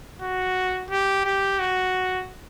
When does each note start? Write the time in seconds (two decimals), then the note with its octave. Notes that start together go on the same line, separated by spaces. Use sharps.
0.22 F#4
0.91 G4
1.25 G4
1.59 F#4